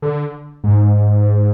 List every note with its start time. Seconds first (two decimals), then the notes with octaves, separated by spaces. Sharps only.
0.02 D3
0.64 G#2